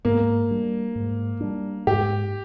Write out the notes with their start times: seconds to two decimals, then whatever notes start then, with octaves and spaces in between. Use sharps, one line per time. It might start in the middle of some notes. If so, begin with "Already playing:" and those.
0.05 G#2 A#3
0.50 G3 D4
0.95 G#2
1.41 G3 D4
1.87 G#2 G4